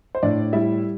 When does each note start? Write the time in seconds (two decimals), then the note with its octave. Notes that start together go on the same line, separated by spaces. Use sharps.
0.15 C5
0.23 A2 D4 D5
0.53 G3 E4 E5